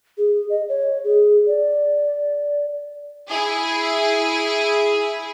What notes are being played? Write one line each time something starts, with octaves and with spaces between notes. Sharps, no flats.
G#4
D#5
C#5
G#4
D5
E4 G#4